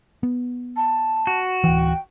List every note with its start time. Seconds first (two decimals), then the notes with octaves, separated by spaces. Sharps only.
0.23 B3
0.76 A5
1.27 F#4
1.64 D1 E3 G5